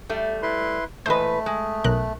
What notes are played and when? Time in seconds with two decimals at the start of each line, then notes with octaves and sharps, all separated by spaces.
0.09 G3 A3
0.42 E4 B4 C6
1.06 A#2 E3 A3 B4 C5 D#5
1.46 G#3
1.84 B1 A#4 F#6